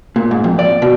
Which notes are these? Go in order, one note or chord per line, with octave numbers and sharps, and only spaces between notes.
A#2
G#2
F2
D5
B2